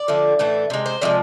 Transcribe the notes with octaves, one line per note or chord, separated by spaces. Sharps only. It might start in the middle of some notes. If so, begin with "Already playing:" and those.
Already playing: D5
D3 F3 A3
A2 E3 A3
C3 G#3
C5
C3 F3 G#3 D5